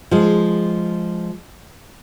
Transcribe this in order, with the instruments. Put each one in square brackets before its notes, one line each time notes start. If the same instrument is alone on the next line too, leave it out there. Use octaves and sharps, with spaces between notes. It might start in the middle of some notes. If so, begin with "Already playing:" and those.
[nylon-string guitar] F3 G#3